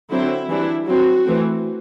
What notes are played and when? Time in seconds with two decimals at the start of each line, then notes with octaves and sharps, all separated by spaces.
0.10 D3 F#3 C4 E4
0.49 E3 G3 D4 E4
0.87 F#3 C4 F#4
1.25 E3 A3 C4